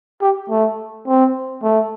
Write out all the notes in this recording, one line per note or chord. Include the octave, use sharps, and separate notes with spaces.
G4
A3
C4
A3